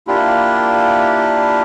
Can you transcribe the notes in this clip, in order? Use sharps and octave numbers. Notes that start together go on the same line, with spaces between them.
A#3 D4 E4 F4 G4